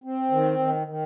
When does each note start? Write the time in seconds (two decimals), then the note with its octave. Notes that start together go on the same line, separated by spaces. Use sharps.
0.04 C4
0.31 D#3
0.59 D#3
0.87 D#3